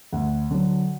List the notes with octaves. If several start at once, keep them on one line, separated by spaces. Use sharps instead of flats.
D2 F#5
D3 F#3